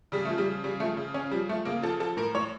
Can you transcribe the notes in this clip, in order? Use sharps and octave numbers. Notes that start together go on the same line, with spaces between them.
C#3 G3
A3
F3
G3
C#3
C#3 G3
F3 A3
C#3
C#3 C#4
F3 G3
F3 A3
C#3 A#3
F3 A4
F3 A4
A2 A#4
A2 C#5